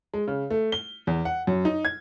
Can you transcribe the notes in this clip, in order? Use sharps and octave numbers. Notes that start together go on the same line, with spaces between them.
G#3
C#3
A3
G7
E2
F#5
F#2
D#4
G#6